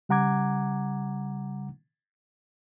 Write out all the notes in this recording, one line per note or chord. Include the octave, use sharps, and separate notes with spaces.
C#3 G3 F#5 A#5 D6 G#6